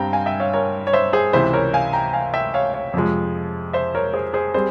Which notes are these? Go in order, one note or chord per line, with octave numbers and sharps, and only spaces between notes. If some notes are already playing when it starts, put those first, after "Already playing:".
Already playing: G2 G3 C4 F5 G5 A#5
F5 G#5
E5 G5
C#5 F5
A#4 C#5
C#5
C5 E5
G#4 C5
C#2 C3 E3 C5 E5
A#4 C#5
F5 G#5
G5 A#5
F5 G#5
E5 G5
C#5 F5
C#5 F5
F2 C3 F3 G#3
C5 E5
A#4 C#5
G#4 C5
G#4 C5
G3 C4 G#4 C5